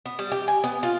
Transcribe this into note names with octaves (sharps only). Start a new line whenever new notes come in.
B3
G3
G4
G#5
B3
F4